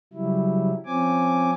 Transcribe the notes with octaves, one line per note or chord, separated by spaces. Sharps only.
C#3 F#3 G3 E4
F3 C4 C#4 G#5 D6